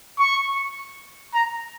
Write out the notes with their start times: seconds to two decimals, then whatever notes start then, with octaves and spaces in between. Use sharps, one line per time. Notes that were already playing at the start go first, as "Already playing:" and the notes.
0.19 C#6
1.34 A#5